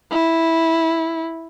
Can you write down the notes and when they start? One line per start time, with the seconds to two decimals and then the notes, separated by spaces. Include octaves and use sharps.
0.11 E4